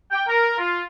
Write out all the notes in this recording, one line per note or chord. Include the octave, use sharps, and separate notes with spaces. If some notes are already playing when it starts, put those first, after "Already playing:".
G5
A#4
F4